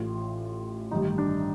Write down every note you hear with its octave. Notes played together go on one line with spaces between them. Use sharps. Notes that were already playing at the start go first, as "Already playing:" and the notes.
Already playing: A1 A2 F4
A1 G2 D#3 D#4
D4